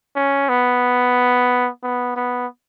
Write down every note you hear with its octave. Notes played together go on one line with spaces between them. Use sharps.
C#4
B3
B3
B3